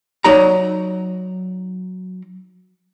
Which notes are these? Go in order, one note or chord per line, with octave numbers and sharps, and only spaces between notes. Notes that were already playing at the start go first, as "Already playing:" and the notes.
F#3 D#4 D5 A#5